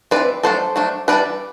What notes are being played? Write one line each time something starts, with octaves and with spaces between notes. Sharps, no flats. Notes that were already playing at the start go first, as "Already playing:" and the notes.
A3 C4 B4 D5
E3
F#3 A3 D4 A4 C5
F#3 A3 D4
E3 G3 B3 D4 B4 D5